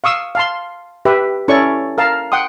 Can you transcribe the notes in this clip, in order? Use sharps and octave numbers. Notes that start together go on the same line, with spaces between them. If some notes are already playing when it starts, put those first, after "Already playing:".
F5 C#6 D#6 E6
F5 A5 C6
G4 B4 E5
C#4 E4 A4 C#5 D5 C#6
A#4 F5 A5
F#5 G5 C6 D#6